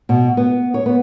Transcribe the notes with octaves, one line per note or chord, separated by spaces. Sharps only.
B2
B3
C#5
B3